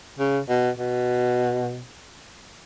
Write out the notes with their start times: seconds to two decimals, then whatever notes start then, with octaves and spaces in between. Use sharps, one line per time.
0.19 C#3
0.49 B2
0.79 B2